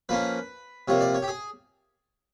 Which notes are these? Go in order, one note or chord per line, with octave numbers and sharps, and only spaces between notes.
F3 A#3 C#4 B4
C3 F3 A#3 C#5
D5
C#5
G4
G#4